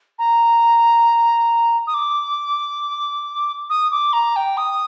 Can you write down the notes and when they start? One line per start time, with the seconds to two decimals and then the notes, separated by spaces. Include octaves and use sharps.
0.19 A#5
1.87 D#6
1.94 D6
3.70 D#6
3.91 D6
4.13 A#5
4.36 G5
4.57 D#6